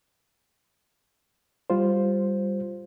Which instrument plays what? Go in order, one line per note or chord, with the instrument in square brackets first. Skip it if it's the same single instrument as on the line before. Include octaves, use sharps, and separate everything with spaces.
[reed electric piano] G3 F4 C5